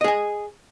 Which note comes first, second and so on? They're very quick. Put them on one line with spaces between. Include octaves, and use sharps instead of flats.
D#5 G#4 G#5